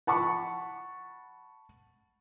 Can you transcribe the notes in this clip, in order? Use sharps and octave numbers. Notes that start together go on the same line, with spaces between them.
F#5 A5 B5 C#6